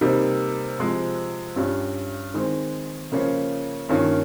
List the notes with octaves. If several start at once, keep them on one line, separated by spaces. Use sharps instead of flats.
C3 G3 A#3 D#4
C3 F3 G#3
G2 G3 C#4 F4
D#3 G#3 C4
C#3 F3 A#3 C#4 F4
G2 D#3 A#3 C#4 F4